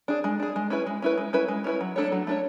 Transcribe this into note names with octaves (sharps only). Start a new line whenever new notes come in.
D4 G#4
G#3
D4 G#4
G#3
C#4 E4 B4
G#3
C#4 E4 B4
G#3
C#4 E4 B4
G#3
C#4 E4 B4
F#3
A3 D4 A4 C#5
F#3
A3 D4 A4 C#5